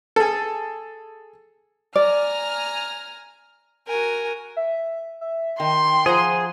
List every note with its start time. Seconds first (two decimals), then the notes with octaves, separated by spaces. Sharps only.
0.16 G#4 A4
1.96 D5 G#5 A#5 F6
3.86 F#4 A#4 G#5
4.56 E5
5.21 E5
5.60 D#3 G5 C6
6.06 F3 G#4 C5 F#5 A#5